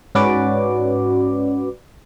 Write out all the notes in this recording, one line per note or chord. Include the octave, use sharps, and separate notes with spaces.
G#2 C#4 F#4 B4 D5 D6